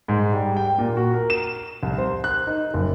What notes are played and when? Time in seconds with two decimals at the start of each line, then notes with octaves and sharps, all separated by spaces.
0.08 G#2
0.32 G3
0.57 G5
0.78 A#2
0.97 F#4
1.14 A#4
1.30 E7
1.83 C2
1.98 C5
2.24 F#6
2.47 D#4
2.74 F#1